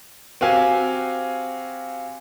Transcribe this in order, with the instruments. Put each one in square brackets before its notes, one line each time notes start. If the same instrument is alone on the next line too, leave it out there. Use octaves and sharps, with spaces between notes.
[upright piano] C4 F#4 G4 F5 G#5